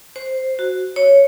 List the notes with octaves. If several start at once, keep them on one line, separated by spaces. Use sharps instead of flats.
C5
F#4
C#5